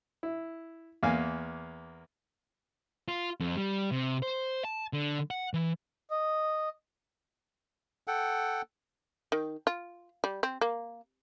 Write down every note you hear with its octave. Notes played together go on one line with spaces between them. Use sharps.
E4
E2 A#3 A#4 F5 G#5
F4
F2
G3
C3
C5
A5
D3
F#5
E3
D#5
A4 F#5 G5
D#3
F4
G3
C4
A#3